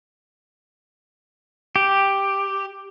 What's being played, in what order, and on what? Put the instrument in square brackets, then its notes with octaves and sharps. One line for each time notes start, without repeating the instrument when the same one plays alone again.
[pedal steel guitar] G4